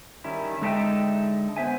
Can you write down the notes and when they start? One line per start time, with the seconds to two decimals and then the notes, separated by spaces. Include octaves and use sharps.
0.24 D#3 G3 C#4 E4
0.62 D3 G#3 D#4 A4 E5 G5
1.57 B3 C5 E5 G#5